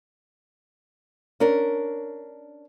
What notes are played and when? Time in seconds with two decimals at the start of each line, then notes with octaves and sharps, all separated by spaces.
1.40 C#4 D4 A#4